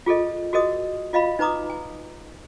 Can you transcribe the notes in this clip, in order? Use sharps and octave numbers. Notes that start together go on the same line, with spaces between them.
F4 G#4 A4 D#5
F#4 G#4 A#4 D#5 D#6
F4 D#5 F5 B5
D#4 B4 A#5 D6 D#6
G#5